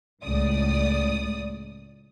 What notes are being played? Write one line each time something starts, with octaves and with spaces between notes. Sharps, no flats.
C#2 A2 D5 D#6